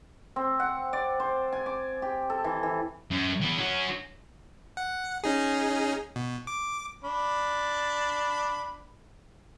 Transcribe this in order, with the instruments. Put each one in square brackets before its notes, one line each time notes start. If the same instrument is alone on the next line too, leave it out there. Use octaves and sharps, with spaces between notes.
[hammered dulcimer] C4
F#5
D5
C5
G#5
D6
G4
A4
E3
E3
[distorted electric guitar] F#2
E3 B3
C#4 F#4
[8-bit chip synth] F#5
C#4 D#4 G#4
B2
D6
[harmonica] D4 B5